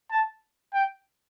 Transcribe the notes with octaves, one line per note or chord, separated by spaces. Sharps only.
A5
G5